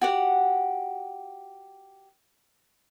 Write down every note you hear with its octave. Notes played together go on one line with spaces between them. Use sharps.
F#4 G4 F#5